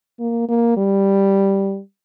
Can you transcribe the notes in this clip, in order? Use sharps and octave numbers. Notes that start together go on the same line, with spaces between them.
A#3
A#3
G3